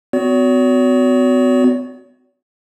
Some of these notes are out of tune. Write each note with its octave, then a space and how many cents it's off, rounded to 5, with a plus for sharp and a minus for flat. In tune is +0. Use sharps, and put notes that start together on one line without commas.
B3 +40 F#4 +0 C#5 +45